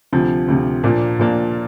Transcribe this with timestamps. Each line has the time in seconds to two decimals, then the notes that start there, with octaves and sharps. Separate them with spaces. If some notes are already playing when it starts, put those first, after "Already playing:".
0.13 D2 C3 F3
0.48 D2 C3 F3
0.84 A#2 F3 A#3 D4
1.19 A#2 F3 A#3 D4